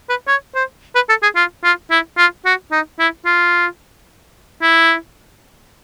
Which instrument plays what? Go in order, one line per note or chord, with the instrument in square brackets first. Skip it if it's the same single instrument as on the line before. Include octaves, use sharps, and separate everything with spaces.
[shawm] B4
C#5
C5
B4
A4
G#4
F4
F4
E4
F4
F#4
D#4
E4
F4
E4